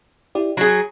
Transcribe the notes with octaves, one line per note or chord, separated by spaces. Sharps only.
E4 G4 D5
F#3 G#4 B5